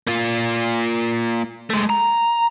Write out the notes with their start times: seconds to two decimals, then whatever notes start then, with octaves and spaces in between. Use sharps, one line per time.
0.07 A#3 F4
1.70 G#3 A3
1.90 A#5